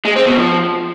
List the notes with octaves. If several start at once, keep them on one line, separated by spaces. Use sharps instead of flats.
G#3
C4
B2
F3